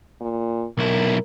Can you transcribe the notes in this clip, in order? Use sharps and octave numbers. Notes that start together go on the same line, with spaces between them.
A#2
B1 E4 A#4